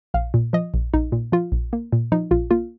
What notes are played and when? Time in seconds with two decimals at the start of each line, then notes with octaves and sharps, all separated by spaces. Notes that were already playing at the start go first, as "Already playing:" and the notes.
0.14 A#1 F5
0.34 A#2
0.53 F3 D#5
0.74 A#1
0.94 A#1 D#4
1.12 A#2
1.32 F3 F4
1.52 A#1
1.73 A#3
1.93 A#2
2.12 F3 D#4
2.31 A#1 F4
2.51 A#3 F4